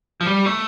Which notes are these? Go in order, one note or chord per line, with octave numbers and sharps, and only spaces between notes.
F3
G3
A3